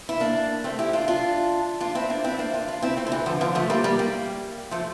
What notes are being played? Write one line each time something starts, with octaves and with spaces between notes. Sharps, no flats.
E4
A#3 D4
A3 C4
E4 G4
D4 F4
D4 F4
D4 F4
C4 E4
A#3 D4
C4 E4
A#3 D4
D4 F4
D4 F4
C4 E4
A3 C4
D3
E3
D3 F3
D3 F3
F3 A3
G3 A#3
G3 A#3
G3 A#3
F3 A3